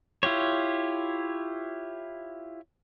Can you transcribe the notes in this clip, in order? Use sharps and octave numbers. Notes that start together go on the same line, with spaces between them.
E4 F4 G4 C#5